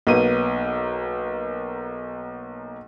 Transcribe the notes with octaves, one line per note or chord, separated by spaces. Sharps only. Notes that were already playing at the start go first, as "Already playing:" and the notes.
B1 A#3 B3 D#7